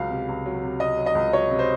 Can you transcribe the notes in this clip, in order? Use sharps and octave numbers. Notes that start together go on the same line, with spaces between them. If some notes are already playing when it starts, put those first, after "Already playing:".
Already playing: C#2 F#3 F5
C3
C#2
F#3
C3
C3 D#5
F#3
D#5
C#2
F#3 C#5
C3
C5